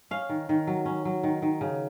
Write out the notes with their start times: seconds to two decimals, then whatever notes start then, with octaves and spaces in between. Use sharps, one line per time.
0.11 C#4 F5
0.29 D#3
0.49 D#3
0.67 F#3
0.86 C#4
1.05 F#3
1.23 D#3
1.42 D#3
1.61 C#3